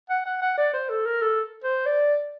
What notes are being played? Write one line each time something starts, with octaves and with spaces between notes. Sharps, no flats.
F#5
F#5
F#5
D5
C5
A4
A#4
A4
C5
D5